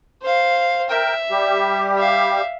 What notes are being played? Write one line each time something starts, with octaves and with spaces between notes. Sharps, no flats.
C5 F5
A#4 E5 G5
G3 G4
E5 F5